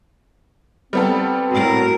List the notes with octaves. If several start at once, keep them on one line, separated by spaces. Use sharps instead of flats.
G3 B3 C4 A4
A2 F#4 A#4